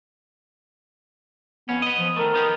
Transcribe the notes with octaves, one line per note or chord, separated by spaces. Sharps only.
F2 B3 C#4
B4 D#5
F3
D#3 A3 A#4
B3 D#4 G4